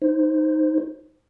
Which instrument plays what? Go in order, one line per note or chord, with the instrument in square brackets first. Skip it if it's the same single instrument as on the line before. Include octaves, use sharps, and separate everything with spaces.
[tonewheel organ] D#4 C5